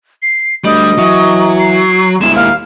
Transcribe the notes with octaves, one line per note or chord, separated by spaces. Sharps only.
C7
D2 G3 D#5
E3 F#3
C7
G1 G#3 E4 E7
D#2 F5